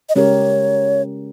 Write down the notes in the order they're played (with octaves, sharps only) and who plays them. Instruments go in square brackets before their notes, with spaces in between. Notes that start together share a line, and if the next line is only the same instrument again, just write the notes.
[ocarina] D#5
[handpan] C#3 G#3 C#4 G4 A#4 [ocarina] C#5